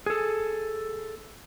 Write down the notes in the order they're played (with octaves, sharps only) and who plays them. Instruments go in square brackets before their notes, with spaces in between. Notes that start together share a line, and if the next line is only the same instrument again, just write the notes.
[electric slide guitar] G#4 A4